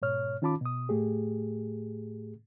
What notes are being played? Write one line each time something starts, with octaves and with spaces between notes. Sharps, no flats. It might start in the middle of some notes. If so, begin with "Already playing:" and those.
G#2 B2 C#5 F6
D#3 C#4 F4 A5 B5 D6
B2 D#6
A2 A3 G4 G#4